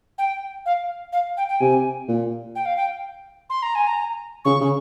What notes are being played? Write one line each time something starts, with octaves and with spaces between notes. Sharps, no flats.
G5
F5
F5
G5
G5
C3 G#5
A#2
G5
F5
G5
C6
A#5
G#5
A#5
C#3 C#6
C#3